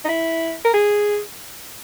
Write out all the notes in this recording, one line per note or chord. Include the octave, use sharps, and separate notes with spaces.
D#4
E4
A#4
G#4